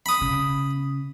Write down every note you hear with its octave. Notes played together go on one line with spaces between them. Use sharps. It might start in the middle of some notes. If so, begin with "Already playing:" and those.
B5 D#6
C#3